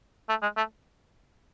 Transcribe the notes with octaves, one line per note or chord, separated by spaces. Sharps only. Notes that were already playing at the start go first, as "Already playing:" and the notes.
A3
G#3
A3